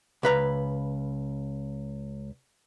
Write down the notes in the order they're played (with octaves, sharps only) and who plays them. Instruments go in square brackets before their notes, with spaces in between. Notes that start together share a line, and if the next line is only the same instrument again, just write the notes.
[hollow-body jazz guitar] C#2 B4 A#5